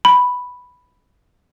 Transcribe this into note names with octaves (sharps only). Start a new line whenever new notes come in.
B5